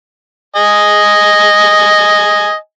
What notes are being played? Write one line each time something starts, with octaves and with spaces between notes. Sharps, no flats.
D#5 G#5